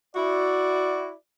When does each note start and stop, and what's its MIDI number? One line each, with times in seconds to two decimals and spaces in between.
0.16 1.12 64
0.16 1.12 66
0.16 1.17 74